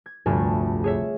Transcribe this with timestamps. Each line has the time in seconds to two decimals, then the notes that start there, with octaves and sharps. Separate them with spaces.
0.06 G#6
0.26 F1 D2 G2 A3 G#5 C#6
0.84 G#4 C#5 E5